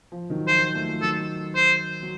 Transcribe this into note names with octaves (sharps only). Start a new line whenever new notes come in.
F3
D#3 F#3
F3 C5
F3
F3 A3
F3 A3
D#3 F#3 A4
C5
F#3